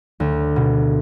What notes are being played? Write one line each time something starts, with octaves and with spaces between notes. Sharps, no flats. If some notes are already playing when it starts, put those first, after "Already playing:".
D2
B2